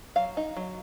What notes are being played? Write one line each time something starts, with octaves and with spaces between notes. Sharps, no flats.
F#3 F5
D#4
F#3